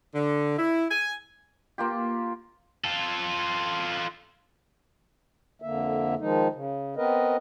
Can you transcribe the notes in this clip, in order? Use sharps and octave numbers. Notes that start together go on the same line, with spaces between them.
D3
E4
G#5
A#3 F4 G4
F4 A4
F2 D3 A#3 E5
D#3 F3 G#3 D#4
C#3
B3 C4 A#4 B4 D#5